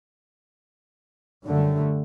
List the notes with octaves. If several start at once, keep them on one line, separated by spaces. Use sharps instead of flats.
F#2 D3 G3 A3